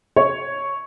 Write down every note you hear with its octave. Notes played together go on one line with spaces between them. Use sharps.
C#5